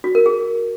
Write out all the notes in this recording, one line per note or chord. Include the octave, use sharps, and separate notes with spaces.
F#4
A#4
G#4